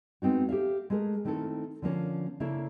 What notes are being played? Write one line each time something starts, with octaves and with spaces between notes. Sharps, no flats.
G#3 B3 C4 D#4 F#4
G4 A4 E5 F5
G#3 A3 G#4 A#4
D#3 A3 C4 E4 A4 A#4
D3 F3 A#3 C#4
C#3 A#3 D4 E4 A4 E5